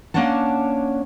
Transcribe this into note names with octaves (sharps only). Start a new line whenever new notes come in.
A#3 C#4 D4 C#5 F#5 A5